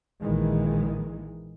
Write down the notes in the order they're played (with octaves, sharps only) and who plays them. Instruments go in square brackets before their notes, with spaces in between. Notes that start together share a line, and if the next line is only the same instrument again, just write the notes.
[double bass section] A#1 D#3 E3 G#3